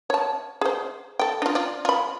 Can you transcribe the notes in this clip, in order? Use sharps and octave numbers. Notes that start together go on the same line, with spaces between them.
C#5 A5
G#4 C5
A4 G5
D4 F4
F4 D5
F4 B5